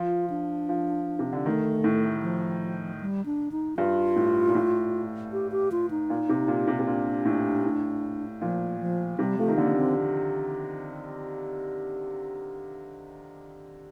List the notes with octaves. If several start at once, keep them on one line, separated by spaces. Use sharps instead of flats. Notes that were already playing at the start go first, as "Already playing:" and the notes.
Already playing: F3 F4
D4
F3
C3
D3
D#3 A3
A2
F3
G3
D4
D#4
G2 F4
A2
A#2
A2
G4
G4
F4
D#4
A#2
C3
A#2
C3
C3
A#2 D4
A2
A2
A#2 F3
F3
C3 G3
F3 A3
D#3
D3 A#3
C4